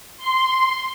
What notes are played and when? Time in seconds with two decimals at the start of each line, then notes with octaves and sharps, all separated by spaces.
0.17 C6